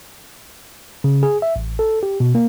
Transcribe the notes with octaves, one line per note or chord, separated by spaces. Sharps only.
C#3
G#4
E5
A1
A4
G4
B2
A#3